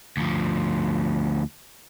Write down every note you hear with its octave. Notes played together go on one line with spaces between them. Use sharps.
D2 F3